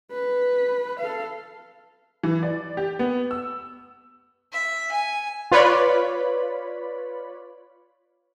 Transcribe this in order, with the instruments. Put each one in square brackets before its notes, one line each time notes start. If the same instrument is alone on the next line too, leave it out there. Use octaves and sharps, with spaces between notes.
[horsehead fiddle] B4
A4 F5
[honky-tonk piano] E3
D5
G4
B3
E6
[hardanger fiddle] E5
G#5
[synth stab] F4 B4 C#5 D5 B5